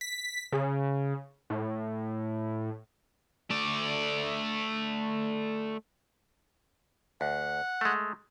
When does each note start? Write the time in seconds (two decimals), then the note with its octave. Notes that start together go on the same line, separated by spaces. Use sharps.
0.01 B6
0.52 C#3
1.50 A2
3.50 A3 D5
7.21 D2 F#5
7.81 G#3 A3